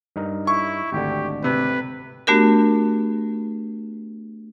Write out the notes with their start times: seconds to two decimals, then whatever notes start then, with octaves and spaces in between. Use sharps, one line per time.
0.16 G2 D#4 A#4
0.47 E4 C#6
0.92 G#1 D2 D3 G4
1.44 C3 B4
2.27 A3 B3 D4 F#4 G4 A#4